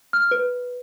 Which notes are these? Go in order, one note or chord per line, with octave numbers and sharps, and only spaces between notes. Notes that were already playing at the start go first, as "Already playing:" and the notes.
F6
B4